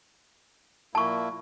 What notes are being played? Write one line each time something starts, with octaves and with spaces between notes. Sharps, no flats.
A#2 A#3 E4 A5 C#6